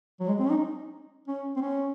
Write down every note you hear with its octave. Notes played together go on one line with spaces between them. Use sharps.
F#3
G#3
C4
C#4
D#4
C#4
C4
C#4